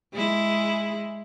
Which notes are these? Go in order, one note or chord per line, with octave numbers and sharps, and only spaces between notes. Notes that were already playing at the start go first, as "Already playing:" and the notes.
G#3 E4